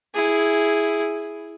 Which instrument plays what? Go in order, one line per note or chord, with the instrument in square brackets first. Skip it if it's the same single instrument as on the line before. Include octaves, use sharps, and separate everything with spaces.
[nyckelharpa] E4 G#4